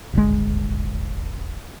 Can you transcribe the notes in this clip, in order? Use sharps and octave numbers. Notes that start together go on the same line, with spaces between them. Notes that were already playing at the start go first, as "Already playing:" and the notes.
D#1 G#1 D2 G#3